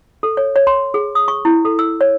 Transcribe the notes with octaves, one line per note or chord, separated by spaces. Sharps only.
A4
C#5
C#5
C6
G#4
D#6
C#6
E4
A4
E6
C#5